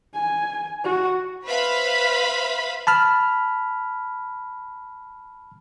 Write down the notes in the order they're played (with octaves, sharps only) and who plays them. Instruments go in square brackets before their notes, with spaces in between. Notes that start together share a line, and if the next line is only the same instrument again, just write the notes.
[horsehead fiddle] G#5
F#4
[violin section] B4 C5 E5 F5 B5
[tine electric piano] A5 B5 F6